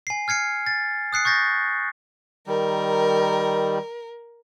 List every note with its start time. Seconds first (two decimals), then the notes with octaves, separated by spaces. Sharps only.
0.07 G#5 C7
0.28 F6 G#6 C7 C#7
0.67 A6
1.13 D#6 F#6 C7 C#7
1.25 C#6 G6 A6 A#6
2.47 D#3 G3 A#4